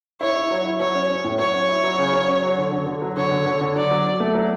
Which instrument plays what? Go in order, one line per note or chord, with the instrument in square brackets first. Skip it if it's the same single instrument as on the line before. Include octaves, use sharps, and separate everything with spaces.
[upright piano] E4 [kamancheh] C#5
[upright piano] E4
F#3
E4
[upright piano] F#3 [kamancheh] C#5
[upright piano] C#4
C#4
A2
[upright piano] F#3 [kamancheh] C#5
[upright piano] C#4
E4
F#3
C#3
F#3
C#4
F#3
D3
D3
D3
F#3
[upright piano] D3 [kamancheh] C#5
[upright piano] D3
D3
D3
[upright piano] F#3 [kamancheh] D5
[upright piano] F#3
F#3
A3
F#3